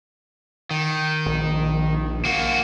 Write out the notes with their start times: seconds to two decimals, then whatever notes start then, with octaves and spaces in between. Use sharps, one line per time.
0.71 D#3
1.26 A#1
2.25 A#3 F#4